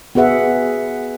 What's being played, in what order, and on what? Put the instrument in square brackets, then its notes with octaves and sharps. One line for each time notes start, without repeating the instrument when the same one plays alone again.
[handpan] B3 F#4 G#4 B4 E5 F#5